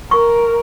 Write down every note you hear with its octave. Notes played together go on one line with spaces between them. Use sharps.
A#4 C#6